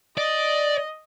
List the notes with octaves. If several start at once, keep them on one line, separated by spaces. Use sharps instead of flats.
D5 D#5